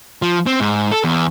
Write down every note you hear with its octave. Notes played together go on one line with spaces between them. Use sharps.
F3
C4
G#2
A4
E2